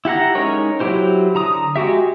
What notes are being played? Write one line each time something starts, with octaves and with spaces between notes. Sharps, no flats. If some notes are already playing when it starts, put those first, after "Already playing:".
E4 G4 F#5 A#5
G#3 C#4 D#4 A#4 C#5
F#3 E4 G4 C5
D3 A#5 D#6
G#3 F#4 G4 E5